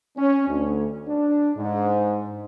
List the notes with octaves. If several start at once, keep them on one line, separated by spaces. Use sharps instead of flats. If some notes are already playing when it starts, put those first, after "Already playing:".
C#4
D2
D4
G#2